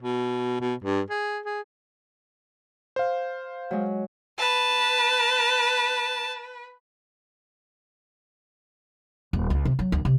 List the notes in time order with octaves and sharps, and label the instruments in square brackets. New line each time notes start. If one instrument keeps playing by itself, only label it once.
[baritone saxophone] B2
B2
G2
G#4
G#4
[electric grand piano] C5 F5
[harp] F#3 G#3
[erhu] B4 [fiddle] A5
[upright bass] D#1
C#2
C3
F#3
D2
C3